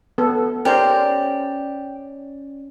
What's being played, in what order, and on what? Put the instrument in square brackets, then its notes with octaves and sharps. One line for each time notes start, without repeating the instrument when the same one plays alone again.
[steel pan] B3 A4
[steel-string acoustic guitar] C#4 D5 A#5 [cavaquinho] G4 [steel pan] A#4 C5